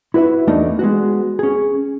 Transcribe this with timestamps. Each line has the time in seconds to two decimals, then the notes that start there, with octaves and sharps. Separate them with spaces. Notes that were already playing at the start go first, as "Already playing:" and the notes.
0.14 E4 F#4 B4 D5 E5
0.47 E2 A3 A#3 D4 D#4
0.79 G#3 B3 F#4
1.39 C#4 G#4